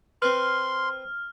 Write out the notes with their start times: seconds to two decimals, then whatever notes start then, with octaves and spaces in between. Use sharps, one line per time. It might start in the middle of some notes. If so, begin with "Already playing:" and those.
0.22 C4 B4 C6 F6